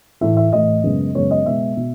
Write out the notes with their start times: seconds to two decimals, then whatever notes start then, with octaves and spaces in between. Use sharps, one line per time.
0.21 A2 E3 A3 E5
0.37 E5
0.52 A2 E3 A3 D#5
0.84 F#2 C#3 G#3 B3
1.15 F#2 C#3 G#3 B3 C#5
1.31 D#5
1.46 B2 G#3 B3 E5
1.77 B2